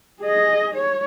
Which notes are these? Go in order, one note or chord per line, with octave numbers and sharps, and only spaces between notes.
G#4 D#5
C#5